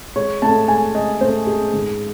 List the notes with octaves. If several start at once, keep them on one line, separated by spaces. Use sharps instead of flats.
G#3 C#5
A2 A5
G#3 G#5
G#3 D#5
A2 C5
G#3 G#4
G#2